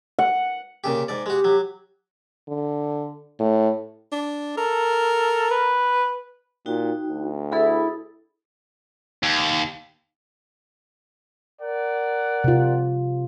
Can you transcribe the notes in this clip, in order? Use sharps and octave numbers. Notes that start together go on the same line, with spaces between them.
F#5
A#2 C#3 G4
G#2 D5
G#3 F#4 G4
F#3
D3
A2
D4
A4 A#4
B4
A#2 D#4 F#4 G5
D2
E4 G#4 A4 D#6
D#2
A#4 D5 F#5
C3 F4